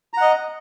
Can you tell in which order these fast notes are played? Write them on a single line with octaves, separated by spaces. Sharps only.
A#5 F#5 D#5